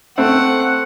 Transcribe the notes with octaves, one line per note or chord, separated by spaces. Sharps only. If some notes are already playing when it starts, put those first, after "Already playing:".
A3 C4 F#5